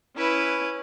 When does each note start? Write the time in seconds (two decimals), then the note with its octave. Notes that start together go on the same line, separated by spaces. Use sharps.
0.16 C#4 E4 B4